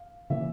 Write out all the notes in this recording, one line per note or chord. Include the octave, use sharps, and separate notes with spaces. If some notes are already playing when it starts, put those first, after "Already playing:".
Already playing: F5
C#3 E3 A#3 C#4 E5